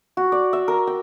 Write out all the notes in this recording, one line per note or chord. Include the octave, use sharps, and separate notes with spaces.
F#4
D5
E5
A#4
G5